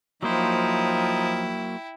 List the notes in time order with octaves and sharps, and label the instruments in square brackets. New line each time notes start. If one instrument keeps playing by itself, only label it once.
[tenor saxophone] F3 [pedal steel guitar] F#3 A#3 C5 [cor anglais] D#4 [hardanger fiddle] E4 G5